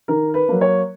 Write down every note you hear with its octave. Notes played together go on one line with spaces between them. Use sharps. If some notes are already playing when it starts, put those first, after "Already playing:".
D#3 A#4
B4
F#3 A#3
C#5